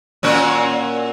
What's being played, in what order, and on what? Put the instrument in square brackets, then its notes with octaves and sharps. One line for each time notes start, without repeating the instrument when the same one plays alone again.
[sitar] A#2 C#4 F#4